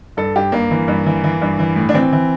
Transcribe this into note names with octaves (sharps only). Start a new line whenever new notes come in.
G2 A4
G2 G4
G2 A#3
E3
G2
E3
E3
G2
E3
A2
D4
E3 C4
E3